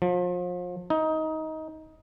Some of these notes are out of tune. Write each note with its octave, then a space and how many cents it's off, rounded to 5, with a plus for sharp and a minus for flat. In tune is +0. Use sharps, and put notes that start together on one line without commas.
F3 +35
D#4 +20